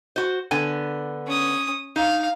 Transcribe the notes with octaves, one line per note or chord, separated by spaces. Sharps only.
F#4 C5
D3 B3 G#5
C#4 D#6
D#4 F5